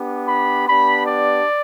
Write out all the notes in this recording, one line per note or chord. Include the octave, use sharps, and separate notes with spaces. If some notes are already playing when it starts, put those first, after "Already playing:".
Already playing: B3 D4 G4
B5
B3 D4 G4 B5
D5